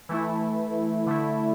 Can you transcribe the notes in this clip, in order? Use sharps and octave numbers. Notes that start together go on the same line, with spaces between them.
E3 A3 E4
D3 A3 E4